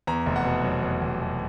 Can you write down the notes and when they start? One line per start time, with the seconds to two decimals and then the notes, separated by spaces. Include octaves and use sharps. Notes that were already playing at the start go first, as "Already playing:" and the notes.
0.07 E2 A#5
0.26 F1
0.36 F#5
0.45 B2
0.64 F#3
0.83 E2
1.01 F1
1.20 B2